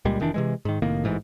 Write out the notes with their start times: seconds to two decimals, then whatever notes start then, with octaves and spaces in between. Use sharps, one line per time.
0.05 C#2 A#2 G3 G#3
0.20 F1 D#3 E3 D4
0.34 C3 E3 G#3
0.65 G#2 D#3
0.82 C2 A2 D#3 A#3
1.04 A1 G#2 E3